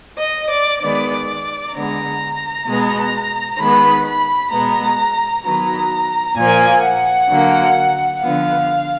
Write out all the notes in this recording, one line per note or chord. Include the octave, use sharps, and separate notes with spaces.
D#5
D5
D#3 G#3 B3 D5
D3 G#3 B3 A#5
B2 G#3 B3
D#3 G#3 B3 B5
B5
B2 G#3 B3 A#5
D#3 F#3 B3 A#5
A#2 F3 A#3 G#5
F#5
D3 F#3 A#3
D3 F3 B3 F5